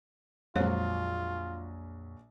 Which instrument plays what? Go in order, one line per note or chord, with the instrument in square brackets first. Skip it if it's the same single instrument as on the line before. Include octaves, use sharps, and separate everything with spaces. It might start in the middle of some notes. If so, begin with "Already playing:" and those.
[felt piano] A#1 F#3 [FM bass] F2 [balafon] G#3 C5 C#5 [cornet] F4